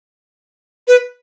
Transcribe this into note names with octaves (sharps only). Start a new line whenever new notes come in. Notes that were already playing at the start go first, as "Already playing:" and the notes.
B4